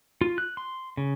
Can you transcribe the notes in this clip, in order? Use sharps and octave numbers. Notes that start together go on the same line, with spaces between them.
F4
F#6
C6
C#3